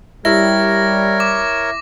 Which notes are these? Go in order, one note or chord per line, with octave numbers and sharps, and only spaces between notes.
G3 E4 A#4 C#5 A#6
D6